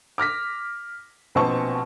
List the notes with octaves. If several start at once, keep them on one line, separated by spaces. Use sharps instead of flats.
D6 F6 A#6 B6
A#1 B2 C4 D#5 A5 C#6